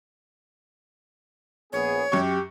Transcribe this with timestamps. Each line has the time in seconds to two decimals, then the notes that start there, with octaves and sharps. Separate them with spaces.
1.73 A#1 B3 G#4 C#5
2.12 F#2 G4 C#6